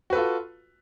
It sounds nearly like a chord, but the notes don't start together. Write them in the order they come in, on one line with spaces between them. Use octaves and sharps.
F#4 B4 A4 F4